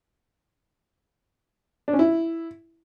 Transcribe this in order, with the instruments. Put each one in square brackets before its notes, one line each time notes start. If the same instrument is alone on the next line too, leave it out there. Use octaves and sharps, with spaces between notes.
[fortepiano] D4
C#4
E4